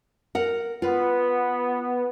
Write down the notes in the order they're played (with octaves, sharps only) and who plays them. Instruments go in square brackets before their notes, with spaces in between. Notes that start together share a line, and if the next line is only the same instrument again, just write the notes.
[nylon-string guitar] A#4 F#5
[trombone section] B3 [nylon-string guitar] F4 B4